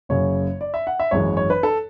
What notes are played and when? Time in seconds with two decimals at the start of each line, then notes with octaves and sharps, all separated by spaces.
0.09 F#1 F#2 C#3 C#5
0.61 D5
0.74 E5
0.87 F#5
1.00 E5
1.11 G#1 F#2 E3 G#3 C#5
1.37 C#5
1.50 B4
1.63 A4